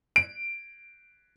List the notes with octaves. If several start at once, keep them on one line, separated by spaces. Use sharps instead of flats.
D7